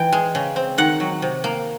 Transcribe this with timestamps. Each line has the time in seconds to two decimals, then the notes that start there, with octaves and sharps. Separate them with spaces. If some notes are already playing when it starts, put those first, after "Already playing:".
Already playing: E3 G5
0.13 G#3
0.35 C#3
0.56 C4
0.78 D#3 F#5
1.00 F#3
1.22 C3
1.44 A#3